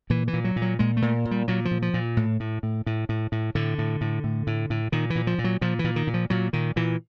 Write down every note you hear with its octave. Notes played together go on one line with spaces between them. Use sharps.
A#2 E3
E3
A#2
F#3
A#2
F#3
A#2 G#3
A3
A#2
A#2
G3
A#2 F#3
F3
A#2
F3
A#2
A2
A2
A2
A2
A2
A2
A2 D3
A2
A2
A2
A2
A2
A#2 D#3
E3
A#2
F3
A#2
F#3
A#2 F3
E3
A#2
D#3
A#2
F3
A#2 F#3
A#2 D#3
A#2 E3